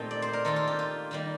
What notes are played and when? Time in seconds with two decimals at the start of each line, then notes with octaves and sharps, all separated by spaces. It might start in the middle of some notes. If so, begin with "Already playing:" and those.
Already playing: A#2 A3 C4 D#4 G4
0.11 D5
0.22 C5
0.33 A#4
0.45 D#3 A#3 F4 A4
0.56 F4
0.67 G4
0.79 F4
1.11 D#3 G3 A#3